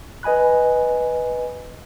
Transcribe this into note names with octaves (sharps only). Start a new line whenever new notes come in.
B4 D#5 G#5 B5 F#6